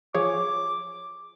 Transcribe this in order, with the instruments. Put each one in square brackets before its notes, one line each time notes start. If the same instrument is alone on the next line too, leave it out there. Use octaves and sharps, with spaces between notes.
[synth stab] F3 G#4 C#5 [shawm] D6